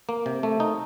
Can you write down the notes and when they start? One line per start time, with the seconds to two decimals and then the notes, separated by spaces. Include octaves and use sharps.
0.09 A#3
0.26 C3
0.43 A3
0.60 D#4